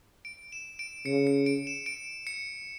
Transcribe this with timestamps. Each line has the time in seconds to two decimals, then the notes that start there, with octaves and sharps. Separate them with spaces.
0.25 D7
0.52 E7
0.79 D7
1.06 C#3 C#7
1.27 C#7
1.46 D7
1.67 E7
1.86 D7
2.27 C#7